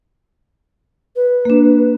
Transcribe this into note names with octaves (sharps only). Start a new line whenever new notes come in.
B4
A#3 D4